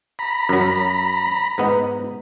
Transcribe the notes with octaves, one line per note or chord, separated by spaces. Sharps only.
A#5 B5
F#2 F#3
G#2 B3 D#4